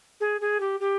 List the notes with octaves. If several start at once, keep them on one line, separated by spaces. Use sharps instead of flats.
G#4
G#4
G4
G4